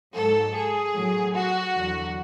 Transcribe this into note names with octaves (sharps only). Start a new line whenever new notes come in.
G#2 F#3 A4
G#4
A2 F#3
F#4
E2 D3 F#3